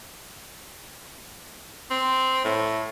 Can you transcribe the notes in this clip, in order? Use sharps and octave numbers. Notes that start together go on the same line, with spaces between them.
C4
A2